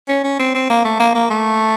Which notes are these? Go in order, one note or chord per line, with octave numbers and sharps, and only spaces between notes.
C#4
C#4
C4
C4
A#3
A3
A#3
A#3
A3